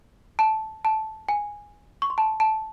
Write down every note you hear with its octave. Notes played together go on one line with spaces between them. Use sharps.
A5
A5
G#5
C#6
C6
A5
A5